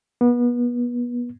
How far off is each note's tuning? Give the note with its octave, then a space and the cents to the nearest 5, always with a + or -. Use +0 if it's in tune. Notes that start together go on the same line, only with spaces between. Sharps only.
B3 -30